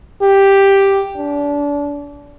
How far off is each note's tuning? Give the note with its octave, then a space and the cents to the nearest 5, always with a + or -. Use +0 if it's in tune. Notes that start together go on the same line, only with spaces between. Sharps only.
G4 +0
D4 -30